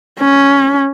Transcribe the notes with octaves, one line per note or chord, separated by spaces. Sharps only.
C#4